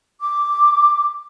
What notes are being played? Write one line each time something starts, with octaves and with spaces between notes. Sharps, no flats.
D6